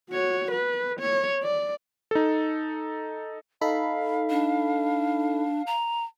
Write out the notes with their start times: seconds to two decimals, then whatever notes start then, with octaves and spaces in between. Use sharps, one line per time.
0.10 F#4 C#5
0.51 B4
1.00 C#5
1.43 D5
2.11 D#4 A4
3.61 D#4 A4 F5 B5
4.30 D4
5.67 A#5